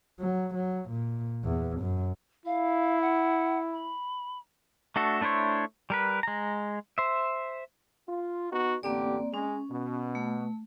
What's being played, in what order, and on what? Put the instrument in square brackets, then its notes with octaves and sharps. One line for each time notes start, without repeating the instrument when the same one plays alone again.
[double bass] F#3
F#3
A#2
E2
F#2
[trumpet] E4 [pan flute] F5
[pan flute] F#5
B5
[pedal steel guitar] A3 D4 F#4 A4
A3 D4 E4 C5 C#5
G3 A#4 B4
G#3 A#5
C5 E5
[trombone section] F4
B3 D#4 F#4
[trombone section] A1 D3 G4 [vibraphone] A#3 C4 D5
[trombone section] G#3 [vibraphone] C#4
[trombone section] B2
[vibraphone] A3